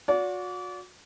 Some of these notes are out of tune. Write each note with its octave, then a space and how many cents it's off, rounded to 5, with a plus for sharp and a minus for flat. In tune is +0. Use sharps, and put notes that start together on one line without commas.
F#4 -35 D5 -35